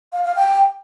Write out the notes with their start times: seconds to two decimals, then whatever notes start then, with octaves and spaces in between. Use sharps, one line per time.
0.12 F5
0.24 F5
0.36 G5